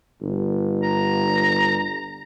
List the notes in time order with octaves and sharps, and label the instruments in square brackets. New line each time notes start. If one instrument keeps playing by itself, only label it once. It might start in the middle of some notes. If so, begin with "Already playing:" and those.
[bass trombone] G1
[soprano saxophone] A#5